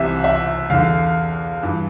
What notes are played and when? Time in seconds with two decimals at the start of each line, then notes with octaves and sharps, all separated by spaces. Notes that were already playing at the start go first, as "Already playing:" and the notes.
Already playing: C2 C3 E3 E5
0.24 E5
0.70 E2 D3 F5
1.63 G2 E3